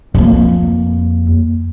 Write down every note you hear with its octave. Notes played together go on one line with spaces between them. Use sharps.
F2 A#3